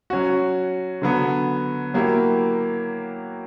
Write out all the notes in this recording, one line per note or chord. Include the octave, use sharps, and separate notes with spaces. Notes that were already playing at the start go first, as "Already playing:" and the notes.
F#3 C#4 F#4
D3 F#3 B3
F#3 A#3 E4 G4